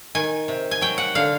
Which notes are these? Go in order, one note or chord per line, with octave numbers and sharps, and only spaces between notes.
D#3 G#5
C3
G#5
F#3 G5
F#5
D3 F5